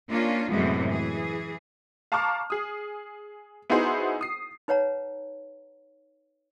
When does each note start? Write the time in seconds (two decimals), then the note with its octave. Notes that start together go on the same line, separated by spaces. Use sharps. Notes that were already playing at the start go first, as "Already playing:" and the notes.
0.10 A#3 C#4 D4 F4
0.51 F#2 A2 C3 E3 G#3 B3
0.90 E3 G#4
2.12 F5 A5 A#5 C#6 D6 F6
2.50 G#4 D#6
3.70 B3 D#4 E4 F#4 G#4 C5
4.21 D#6 C7
4.68 D#4 B4 C#5 F#5 A#5